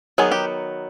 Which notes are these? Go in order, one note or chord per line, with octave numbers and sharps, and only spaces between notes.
D#3 F#3 B3 G#4
G4